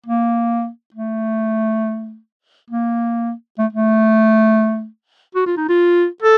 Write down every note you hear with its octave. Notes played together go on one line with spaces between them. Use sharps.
A#3
A3
A#3
A3
A3
F#4
F4
D#4
F4
A4